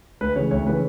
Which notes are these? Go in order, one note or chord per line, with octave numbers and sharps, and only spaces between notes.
D2 B4
C#3 E3 C#5
D2 C#5
C#3 E3 B4